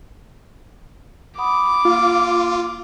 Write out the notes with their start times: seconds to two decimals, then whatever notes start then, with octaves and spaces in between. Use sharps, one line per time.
1.38 F#5 B5 D6 D#6
1.85 A#3 F4